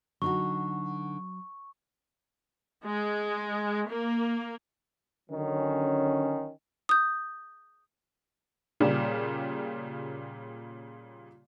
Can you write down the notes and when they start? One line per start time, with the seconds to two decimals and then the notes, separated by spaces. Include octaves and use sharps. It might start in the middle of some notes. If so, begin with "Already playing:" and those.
0.22 D3 F#3 D#4 F#4 C#6
2.83 G#3
3.87 A#3
5.30 D3 D#3 F#3 C#4
6.89 D#6 G6
8.80 A#2 C#3 G3